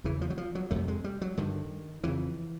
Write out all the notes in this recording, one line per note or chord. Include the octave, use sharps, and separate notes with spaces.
E2 C#3 E3
F3
F#3
F3
F#3
F2 C3 A3
G#3
G3
F#3
G2 D3 D#3
F2 C#3 E3